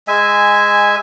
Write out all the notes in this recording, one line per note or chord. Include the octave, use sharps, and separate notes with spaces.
G#3 E5 G#5